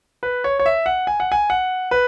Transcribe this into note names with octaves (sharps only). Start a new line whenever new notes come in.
B4
C#5
C#5
E5
F#5
G#5
F#5
G#5
F#5
B4